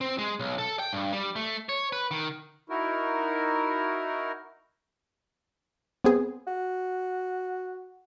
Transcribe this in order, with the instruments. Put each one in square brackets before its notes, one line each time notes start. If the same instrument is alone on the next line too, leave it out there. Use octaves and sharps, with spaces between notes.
[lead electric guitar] C4
G#3
B1
A4
G5
G2
G3
A3
C#5
B4
D#3
[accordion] D#4 E4 F#4 A#4
[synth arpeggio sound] B3 C4 G#4
[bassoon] F#4